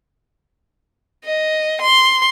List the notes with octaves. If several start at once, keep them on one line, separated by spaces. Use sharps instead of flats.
D#5
C6